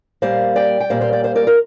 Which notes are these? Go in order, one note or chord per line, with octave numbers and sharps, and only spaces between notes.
A#2 G3 A#3 C5 F5
D5 G5
G5
A#2 G3 A#3 C5 F5
C5 F5
D5 G5
C5 F5
A#4 D5
F4 A#4